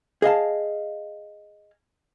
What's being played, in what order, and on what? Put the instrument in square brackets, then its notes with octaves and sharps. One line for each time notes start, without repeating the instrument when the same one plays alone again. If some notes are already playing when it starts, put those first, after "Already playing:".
[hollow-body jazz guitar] G#4 D#5 F5 A5